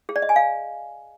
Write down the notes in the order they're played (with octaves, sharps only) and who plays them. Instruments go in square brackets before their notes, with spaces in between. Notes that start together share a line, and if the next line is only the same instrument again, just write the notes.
[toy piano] G#4
D5
D#5
G#5
F5